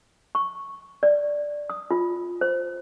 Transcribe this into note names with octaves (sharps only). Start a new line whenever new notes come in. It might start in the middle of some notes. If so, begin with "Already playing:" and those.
C#6
D5
D#6
F4
C5